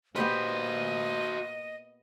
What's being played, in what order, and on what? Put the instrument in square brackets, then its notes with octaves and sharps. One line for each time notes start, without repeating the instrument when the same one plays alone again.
[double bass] A#2 A#3 [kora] B3 G4 B4 [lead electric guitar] F#4 C5 [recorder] D#5